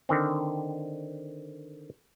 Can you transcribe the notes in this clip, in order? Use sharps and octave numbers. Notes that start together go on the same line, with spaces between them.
D3 D#3 C4